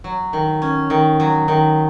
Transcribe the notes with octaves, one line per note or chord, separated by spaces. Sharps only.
F#3
D#3
C#4
D#3
F#3
D#3